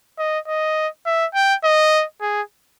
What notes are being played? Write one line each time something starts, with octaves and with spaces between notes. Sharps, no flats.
D#5
D#5
E5
G5
D#5
G#4